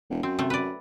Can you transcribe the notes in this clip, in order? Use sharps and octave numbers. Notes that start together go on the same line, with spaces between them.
E1
F#2 C4
C3 A3
B4 D5